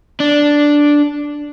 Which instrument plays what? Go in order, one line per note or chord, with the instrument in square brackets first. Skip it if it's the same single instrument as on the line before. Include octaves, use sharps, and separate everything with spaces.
[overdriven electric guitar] D4